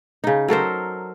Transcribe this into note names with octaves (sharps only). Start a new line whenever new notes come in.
C#3 D#4
F#3 A4 A#4 C5